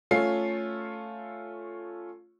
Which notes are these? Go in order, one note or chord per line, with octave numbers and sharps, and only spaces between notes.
A3 C#4 F4 C7